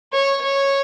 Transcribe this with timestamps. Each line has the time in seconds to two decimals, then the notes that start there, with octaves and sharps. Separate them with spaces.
0.13 C#5
0.42 C#5